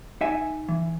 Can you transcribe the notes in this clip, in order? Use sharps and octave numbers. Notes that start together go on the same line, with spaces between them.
D#4 E5 G#5
E3